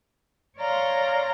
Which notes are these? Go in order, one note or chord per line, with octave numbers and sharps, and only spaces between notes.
C#5 D5 F5 A#5 C6